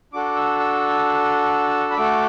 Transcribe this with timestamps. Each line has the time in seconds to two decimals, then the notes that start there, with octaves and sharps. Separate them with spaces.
0.13 D4 F#4 A4 D6
0.36 E6
0.60 E6
1.90 B5
1.97 A3 F#4 A4 D6